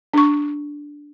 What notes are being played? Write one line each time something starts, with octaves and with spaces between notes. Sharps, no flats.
D4 C#6